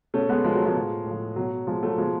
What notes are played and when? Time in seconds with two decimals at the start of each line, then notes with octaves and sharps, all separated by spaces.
0.14 B2 A3 C#4
0.29 G#3 B3
0.44 B2 F3 G#3
0.55 F#3
0.65 F3 G#3
0.76 A2 F3
1.06 A2
1.11 F3
1.36 B2 F#3
1.67 B2 F3 G#3
1.83 F#3 A3
1.98 B2 F3 G#3